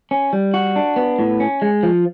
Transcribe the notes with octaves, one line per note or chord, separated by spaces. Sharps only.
C#4
G3
F#4
D4
B3
A2
C#4
G#3
F3